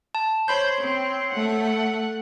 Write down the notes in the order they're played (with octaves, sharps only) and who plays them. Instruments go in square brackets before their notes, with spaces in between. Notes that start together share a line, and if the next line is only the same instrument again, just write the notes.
[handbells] A5
[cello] C5 [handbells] C#5 B5 G6
[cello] C4
A3 F#5